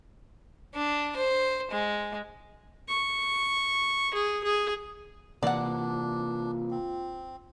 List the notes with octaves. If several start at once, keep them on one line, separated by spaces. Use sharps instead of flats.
D4
C5
G#3
C#6
G#4
G#4
C3 E3 A#3 D4 F4 D5 F#5
C4